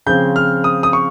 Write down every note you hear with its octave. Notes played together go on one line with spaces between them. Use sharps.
C#3 F3 C4 G6
F6
D#6
D#6
C#6